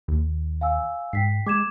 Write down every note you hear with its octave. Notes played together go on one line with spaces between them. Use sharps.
D#2
F5 G#5 E6
G#2 G5 B6 C7
G#3 D6 G#6 E7